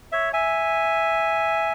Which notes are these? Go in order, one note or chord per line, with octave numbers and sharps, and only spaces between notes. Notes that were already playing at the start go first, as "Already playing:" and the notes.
C#5 E5
E5 G#5